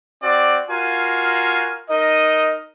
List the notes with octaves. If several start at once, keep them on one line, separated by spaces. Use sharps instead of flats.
C4 F#4 D5
F4 F#4 A#4 F5 G#5
D#4 A#4 D#5